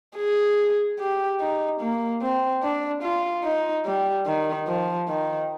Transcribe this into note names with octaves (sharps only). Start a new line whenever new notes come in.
G#4
G4
D#4
A#3
C4
D4
F4
D#4
G3
D#3
F3
D#3